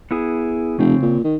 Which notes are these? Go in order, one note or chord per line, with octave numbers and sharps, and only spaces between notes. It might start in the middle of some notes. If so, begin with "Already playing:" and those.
B3 E4 G#4
F1 C#3 C4
A#2
D#3